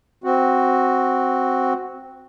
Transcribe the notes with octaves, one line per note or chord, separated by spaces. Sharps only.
C4 F#4